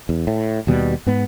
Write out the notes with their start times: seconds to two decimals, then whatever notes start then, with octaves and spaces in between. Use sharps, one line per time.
0.09 E2
0.27 A2
0.67 D#2 B2 G3
1.07 G#2 B3